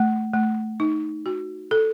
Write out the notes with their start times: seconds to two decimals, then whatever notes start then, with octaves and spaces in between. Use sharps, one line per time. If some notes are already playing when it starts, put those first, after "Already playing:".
Already playing: A3
0.34 A3
0.80 D#4
1.26 F#4
1.71 A4